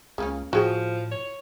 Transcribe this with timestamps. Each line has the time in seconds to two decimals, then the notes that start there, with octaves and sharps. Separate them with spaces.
0.18 C#2 C#3 A#3 C#4
0.53 A2 F3 F#4 G#4 G5
1.12 C#5